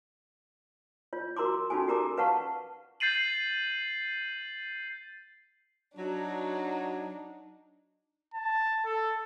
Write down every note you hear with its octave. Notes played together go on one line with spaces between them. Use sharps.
F4 C#5
F#4 A#4 A#5 C6 D6
C#4 D#4 F4 F#4 A4 G#5
F#4 G4 A#4 A#5 D6
B4 F5 F#5 A5 C#6
G6 A6 C7 D#7 F#7
F#3 D4 D#4
A5
A4